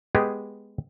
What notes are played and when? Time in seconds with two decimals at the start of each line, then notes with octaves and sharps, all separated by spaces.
0.15 G#3 B3 G4 G#4